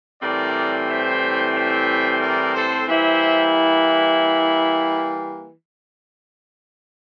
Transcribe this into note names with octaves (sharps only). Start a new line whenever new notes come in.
A2 E3 G3 C4 A#4 D5
C5 E5
C5 E5
A#4 D5
A4 C5
E3 G3 A#3 E4 C5 E5